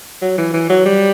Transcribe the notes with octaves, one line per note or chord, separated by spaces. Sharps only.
F#3
E3
E3
F#3
G3